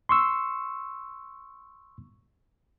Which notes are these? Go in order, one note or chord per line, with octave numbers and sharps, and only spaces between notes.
C6 C#6 E6